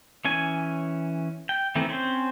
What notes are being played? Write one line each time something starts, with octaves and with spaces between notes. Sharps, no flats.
E3 C#4 G#5
G5
D#3 E3 A3 C4
C4 C#4 C5